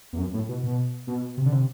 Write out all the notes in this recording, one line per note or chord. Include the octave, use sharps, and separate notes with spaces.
E2
F#2
A2
B2
B2
B2
C3
D3
C3